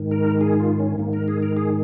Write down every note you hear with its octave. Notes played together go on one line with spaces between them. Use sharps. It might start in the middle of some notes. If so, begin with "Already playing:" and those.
Already playing: G#2 D#3
A#4
G#4
F4
C#4
G#2 D#3 A#3
A#4
G#4
A#4
G#4